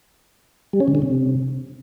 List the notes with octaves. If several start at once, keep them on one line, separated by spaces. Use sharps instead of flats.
G3
C#4
C#3
D3
C3